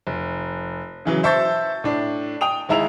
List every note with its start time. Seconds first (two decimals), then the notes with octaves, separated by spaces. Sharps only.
0.07 F1
1.05 C#3 E3 F#3
1.23 C5 E5 A5 C#6 G6 A6
1.84 A2 D4
2.41 G5 D#6 F7
2.69 D#2 G#3 E4 A#5 E6 F7